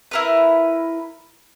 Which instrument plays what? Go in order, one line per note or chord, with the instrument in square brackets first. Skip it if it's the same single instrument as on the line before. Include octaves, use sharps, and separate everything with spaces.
[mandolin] E4 A#4 B4